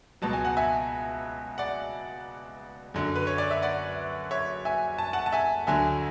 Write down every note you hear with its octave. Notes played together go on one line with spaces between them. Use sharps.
C#2 B2 F#3 A5
G#5
F#5
E5 G#5
D5 F#5
F#2 D3 F#3
B4
C#5
D5
E5
D5 F#5
C#5 E5
E5 G#5
A5
F#5 A5
A5
E5 G#5
D2 D3 F#3 E5 G#5